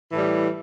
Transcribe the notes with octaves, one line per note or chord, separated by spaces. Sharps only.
A2 E3 G3